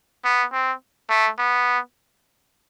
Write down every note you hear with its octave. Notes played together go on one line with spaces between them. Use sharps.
B3
C4
A3
B3